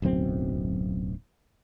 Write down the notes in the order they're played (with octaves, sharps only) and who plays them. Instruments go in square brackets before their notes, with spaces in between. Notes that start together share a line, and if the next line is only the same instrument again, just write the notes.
[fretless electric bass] D1 B1 F#2 C4